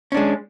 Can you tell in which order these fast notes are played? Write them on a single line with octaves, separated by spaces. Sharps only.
C#4 D4 G#3